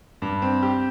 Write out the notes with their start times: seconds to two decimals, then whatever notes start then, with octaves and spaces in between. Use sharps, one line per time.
0.22 G2
0.42 C4
0.63 G4